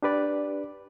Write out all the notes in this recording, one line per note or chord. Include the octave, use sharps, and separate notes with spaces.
D4 G4 B4 D5